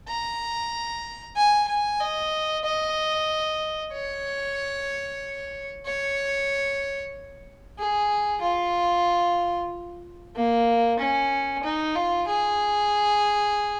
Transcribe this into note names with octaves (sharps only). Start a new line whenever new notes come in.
A#5
G#5
G#5
D#5
D#5
C#5
C#5
G#4
F4
A#3
C#4
D#4
F4
G#4